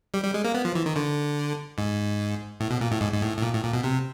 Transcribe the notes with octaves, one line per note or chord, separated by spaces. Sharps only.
G3
G3
G#3
A#3
B3
F3
E3
D#3
D3
G#2
A2
B2
A#2
A2
G#2
G#2
A2
A2
A#2
A2
A#2
B2
C3